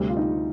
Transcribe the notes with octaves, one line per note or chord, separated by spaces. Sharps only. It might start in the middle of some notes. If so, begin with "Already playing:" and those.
Already playing: D2 C3 G3
F4
D#4